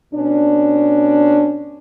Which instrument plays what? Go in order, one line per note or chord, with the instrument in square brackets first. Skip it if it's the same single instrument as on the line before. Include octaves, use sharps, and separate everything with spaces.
[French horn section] B2 C#4 D4